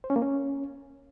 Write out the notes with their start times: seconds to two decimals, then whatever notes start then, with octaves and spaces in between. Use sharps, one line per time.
0.04 C5
0.10 C#4
0.16 A#3
0.22 C#4